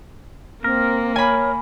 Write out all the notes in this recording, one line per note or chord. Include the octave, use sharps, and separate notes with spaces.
A#3 C4 A#4
C#5 G#5 B5